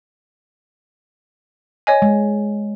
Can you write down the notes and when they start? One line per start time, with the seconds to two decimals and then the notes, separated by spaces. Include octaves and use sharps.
1.87 C#5 D#5 G#5
2.02 G#3